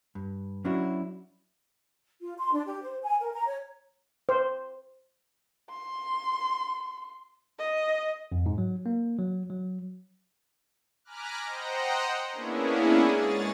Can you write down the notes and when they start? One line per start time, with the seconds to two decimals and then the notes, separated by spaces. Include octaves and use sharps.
0.15 G2
0.65 F#3 C#4 D4 E4 F#4
2.21 F4
2.38 C6
2.53 D4
2.66 G4
2.83 C5
3.03 G#5
3.21 A#4
3.33 A#5
3.47 C#5
4.29 C5
5.70 C6
7.59 D#5
8.32 F2
8.46 G#2
8.58 F#3
8.86 A#3
9.19 F#3
9.50 F#3
11.04 G#5 A#5 B5 D6 F6 F#6
11.46 C5 D#5 F#5 G5 A#5
12.32 A#3 B3 C#4 D4 E4 G#4
13.04 G#2 G#4 C#5 A6